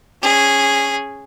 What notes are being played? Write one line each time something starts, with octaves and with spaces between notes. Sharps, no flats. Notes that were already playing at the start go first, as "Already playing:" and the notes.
C#4 G#4